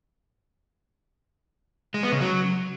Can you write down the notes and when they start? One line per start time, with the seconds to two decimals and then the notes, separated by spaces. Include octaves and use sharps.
1.94 G#3
2.03 B3
2.12 C#3
2.21 F#3